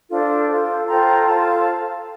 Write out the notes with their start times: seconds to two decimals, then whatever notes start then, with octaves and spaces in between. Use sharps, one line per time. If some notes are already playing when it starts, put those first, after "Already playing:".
0.10 D4 F4 A4 C5
0.49 F4 A4 C5
0.88 F4 A4 C5 G5 A#5
1.28 F4 A4 C5 F5 A5